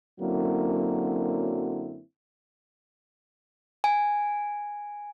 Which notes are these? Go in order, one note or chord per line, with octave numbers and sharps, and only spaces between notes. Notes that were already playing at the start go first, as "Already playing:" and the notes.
F#2 D3 F#3 A#3 C4 E4
G#5